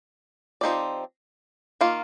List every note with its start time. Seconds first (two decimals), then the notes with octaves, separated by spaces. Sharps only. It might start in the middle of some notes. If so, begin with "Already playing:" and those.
0.61 F3 C4 D#4 G4 D5
1.81 D#3 A#3 F4